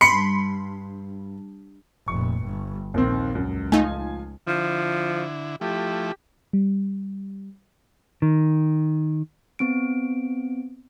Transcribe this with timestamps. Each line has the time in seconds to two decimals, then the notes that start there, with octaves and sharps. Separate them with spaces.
0.01 G2 B5 C6 C#7
2.08 F1 A#2 C#6
2.43 G1 G2
2.94 A#1 D#2 D#3 C4
3.35 C#2 F#2
3.72 F3 A3 D#4 F4 G#5
4.47 D3 F3 E4
5.61 F3 A3 E4 G4
6.53 G3
8.22 D#3
9.59 B3 C4 D7